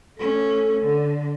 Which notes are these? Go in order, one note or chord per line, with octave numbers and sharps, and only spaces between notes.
A3 C#4 A4
D3